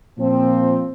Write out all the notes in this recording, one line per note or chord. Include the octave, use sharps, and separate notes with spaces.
A#2 F3 C4